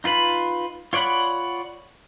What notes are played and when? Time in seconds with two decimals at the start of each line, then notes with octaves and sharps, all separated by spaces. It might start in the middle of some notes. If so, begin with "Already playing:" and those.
0.04 D#4 F4 B4 B5
0.93 F4 C#5 D5 F#5 B5